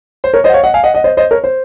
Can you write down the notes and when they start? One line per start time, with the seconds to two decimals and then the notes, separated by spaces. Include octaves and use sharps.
0.24 C5
0.34 A#4 C#5
0.44 C5 D#5
0.49 F#5
0.54 C#5 F5
0.64 D#5 F#5
0.74 F5 G#5
0.84 D#5 F#5
0.94 D#5 F#5
1.04 C5 D#5
1.17 C5 D#5
1.31 A#4 C#5
1.44 C5